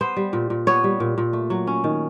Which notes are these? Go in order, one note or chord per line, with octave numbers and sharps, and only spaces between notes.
B3 C5
G3
A#2
A#2
B3 C#5
G3
A#2
A#2
A3
F#3
C#4
D#3